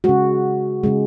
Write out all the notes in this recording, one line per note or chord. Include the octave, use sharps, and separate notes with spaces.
C#3 G#3 F#4
C#3 G#3